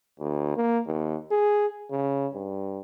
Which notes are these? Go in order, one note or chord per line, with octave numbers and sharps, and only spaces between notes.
D2
A#3
D#2
G#4
C#3
G2